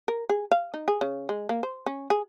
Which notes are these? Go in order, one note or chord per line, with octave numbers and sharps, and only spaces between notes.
A#4
G#4
F5
D#4
G#4
C#3
G#3
A#3
C5
C#4
G#4